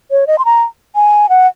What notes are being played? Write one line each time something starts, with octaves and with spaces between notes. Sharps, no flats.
C#5
D#5
C6
A#5
G#5
F#5